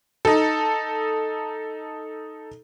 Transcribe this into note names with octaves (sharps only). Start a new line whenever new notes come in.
D#4 A4